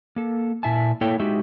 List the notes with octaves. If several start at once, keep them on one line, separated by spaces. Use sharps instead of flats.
A#3 A4
A#2 E4 E5 G#5 A5
A#3 E4 A4 C#5 G5
G#3 D#4 F#4 G4 E5